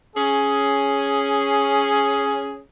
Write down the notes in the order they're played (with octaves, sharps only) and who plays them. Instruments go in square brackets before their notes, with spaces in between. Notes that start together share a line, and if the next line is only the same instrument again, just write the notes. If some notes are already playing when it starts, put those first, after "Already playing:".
[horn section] C#4 G#4